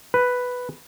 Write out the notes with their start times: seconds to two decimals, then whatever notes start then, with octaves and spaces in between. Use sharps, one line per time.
0.14 B4